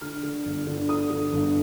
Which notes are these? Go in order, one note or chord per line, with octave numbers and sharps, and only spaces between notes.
D3 F6
D3
G1
D3
D3 D#6
D3
G1